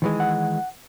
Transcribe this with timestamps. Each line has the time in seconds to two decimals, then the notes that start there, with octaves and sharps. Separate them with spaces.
0.02 D#3 E3 G#3
0.20 F#5